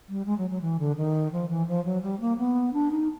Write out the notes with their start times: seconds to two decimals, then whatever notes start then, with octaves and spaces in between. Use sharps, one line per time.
0.09 G3
0.26 G#3
0.38 F#3
0.50 F#3
0.61 E3
0.79 D3
0.96 D#3
1.32 F3
1.50 E3
1.67 F3
1.85 F#3
2.02 G3
2.20 A#3
2.38 B3
2.73 D4
2.91 D#4